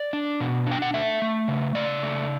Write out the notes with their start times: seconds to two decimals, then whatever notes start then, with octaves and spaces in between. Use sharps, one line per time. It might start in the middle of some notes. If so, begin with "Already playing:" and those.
Already playing: D5
0.13 D4
0.40 B2
0.67 D4 G5
0.82 F#5
0.94 A3 E5
1.22 A3
1.48 C#3
1.75 C#3 D5
2.03 A3